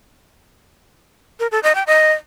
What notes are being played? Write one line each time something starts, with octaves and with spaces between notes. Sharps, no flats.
A#4
A4
D#5
G5
D#5